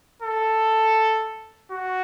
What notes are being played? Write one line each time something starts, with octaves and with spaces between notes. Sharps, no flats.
A4
F#4